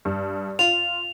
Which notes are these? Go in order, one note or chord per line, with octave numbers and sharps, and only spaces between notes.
G2
F4 F7